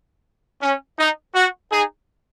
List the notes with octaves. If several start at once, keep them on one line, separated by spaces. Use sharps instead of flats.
C#4
D#4
F#4
D#4 G#4